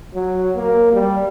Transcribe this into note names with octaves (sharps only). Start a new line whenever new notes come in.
F#3
A#3
G3